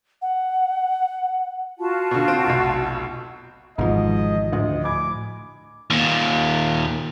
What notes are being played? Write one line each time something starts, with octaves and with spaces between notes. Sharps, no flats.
F#5
F4 F#4 A5
B2 D3
C4 D7
F1 B1
G#1 G#2 B2 E3 F3 D#5
D2 A2 F3 D#5
G#5 B5 D6 G#6
D#2 A#2